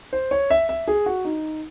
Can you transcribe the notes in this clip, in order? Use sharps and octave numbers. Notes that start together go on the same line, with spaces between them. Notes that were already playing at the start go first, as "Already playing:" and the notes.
C5
C#5
E5
E5
G#4
F#4
D#4